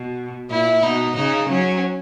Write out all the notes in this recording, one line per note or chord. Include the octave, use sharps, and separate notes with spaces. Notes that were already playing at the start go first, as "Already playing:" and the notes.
Already playing: B2
A#2 E4
B2 D#4
C#3 D#4
F#3 C#4